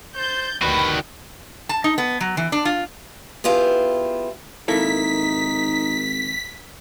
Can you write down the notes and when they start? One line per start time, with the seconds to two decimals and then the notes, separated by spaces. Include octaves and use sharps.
0.16 C5 G6 A6
0.62 D2 D#3 G3 F#4 B4 G5 B5
1.69 A5
1.84 D#4
1.98 B3
2.21 F#3
2.37 E3
2.52 D4
2.65 F4
3.44 B3 E4 F4 G4 G#4
4.68 G#1 A#3 D#4 E4 A4 B6